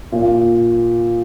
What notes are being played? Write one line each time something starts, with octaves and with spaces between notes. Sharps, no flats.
A#2